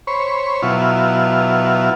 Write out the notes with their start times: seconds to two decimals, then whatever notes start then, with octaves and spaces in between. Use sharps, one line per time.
0.07 C5 C#5 B5 C#6
0.62 B2 F#3 E4 F4